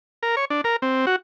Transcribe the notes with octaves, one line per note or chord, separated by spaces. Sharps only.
A#4
C#5
D4
A#4
C4
F#4